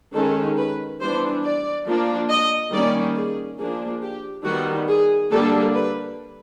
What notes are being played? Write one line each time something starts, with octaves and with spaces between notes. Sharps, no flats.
D#3 G#3 C#4 A4
B4
E3 G3 B3 D4 C5
D5
F3 A#3 D4
D#5
D#3 G3 A#3 C#4 D5
G#4
F3 A#3 D4 G#4
G4
D#3 G3 B3 F#4
G#4
D3 G3 A#3 D4 A4
B4